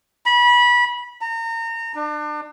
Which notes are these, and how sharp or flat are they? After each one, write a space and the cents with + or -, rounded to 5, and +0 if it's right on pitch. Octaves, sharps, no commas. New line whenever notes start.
B5 -25
A#5 -30
D4 +35